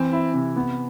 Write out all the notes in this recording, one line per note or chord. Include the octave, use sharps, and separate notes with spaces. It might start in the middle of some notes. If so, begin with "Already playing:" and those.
Already playing: E3 C4
E4
C3
B3